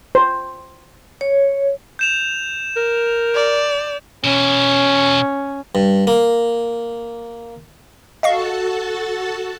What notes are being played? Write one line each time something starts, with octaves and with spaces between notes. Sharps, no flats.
C5
C#5
G6 E7 F7
A#4
D5
B2 E3 C#4
G2
A#3
F#4 A4 D#5 F5 A5 C#6